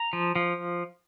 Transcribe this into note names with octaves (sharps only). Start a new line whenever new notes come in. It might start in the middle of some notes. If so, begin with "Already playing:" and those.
Already playing: A#5
F3
F3